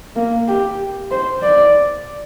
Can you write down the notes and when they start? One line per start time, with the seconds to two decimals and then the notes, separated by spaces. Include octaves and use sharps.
0.16 A#3
0.48 G4
1.11 C5
1.43 D5